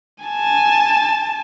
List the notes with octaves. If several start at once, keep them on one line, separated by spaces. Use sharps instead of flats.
G#5 A5